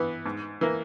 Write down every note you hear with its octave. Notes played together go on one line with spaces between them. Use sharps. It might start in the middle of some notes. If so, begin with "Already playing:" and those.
Already playing: E3 B3
G#2
E3 A#3